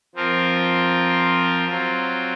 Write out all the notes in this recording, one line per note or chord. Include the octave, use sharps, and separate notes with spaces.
F3 C4 F4 A#4
F#3 C4 F4